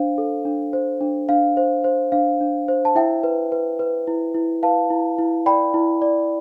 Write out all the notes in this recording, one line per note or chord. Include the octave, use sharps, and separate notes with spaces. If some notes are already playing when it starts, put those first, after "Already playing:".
Already playing: D4 C5 F5
A4
D4
C5
D4
D4 F5
C5
C5
D4 F5
D4
C5
A5
E4 E5 G5
B4
B4
B4
E4
E4
B4 F5 A5
E4
E4
D5 G5 B5
E4
D5